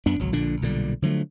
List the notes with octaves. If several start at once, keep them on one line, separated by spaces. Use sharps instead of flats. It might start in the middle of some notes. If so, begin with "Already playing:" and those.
F#2 B3 D4
G#1 C#2 F#3
A#1 A#2 D3 D4
B1 A#2 D3 G3
D3 F3 F#3 A3